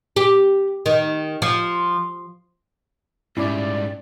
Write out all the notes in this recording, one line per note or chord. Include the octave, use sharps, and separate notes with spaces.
G4
D#3
F3
G#2 G3 C#4 E4 D5 D6